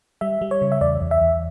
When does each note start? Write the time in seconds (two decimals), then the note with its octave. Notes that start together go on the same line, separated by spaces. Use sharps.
0.21 G3 E5
0.42 G3
0.51 C#5
0.62 C#3
0.72 E5
0.81 E2 D5
1.01 E2
1.11 E5
1.22 E2